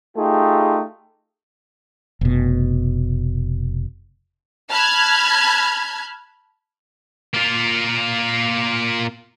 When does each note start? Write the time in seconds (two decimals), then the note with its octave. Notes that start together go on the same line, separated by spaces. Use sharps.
0.17 A3 D#4 F4 G4 G#4
2.21 F1 B2
4.69 A5 B5 F6 F#6 G#6
7.34 A#3 F4